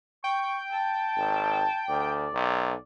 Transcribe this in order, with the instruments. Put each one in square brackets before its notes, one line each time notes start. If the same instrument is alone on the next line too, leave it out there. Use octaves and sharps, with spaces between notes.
[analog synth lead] G5 [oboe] C#6
[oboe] A5
[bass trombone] G#1
[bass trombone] D2 [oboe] D5
[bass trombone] B1